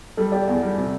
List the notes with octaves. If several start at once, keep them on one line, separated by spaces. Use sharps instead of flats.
G3 A4
G4 D5
E2
G3
C3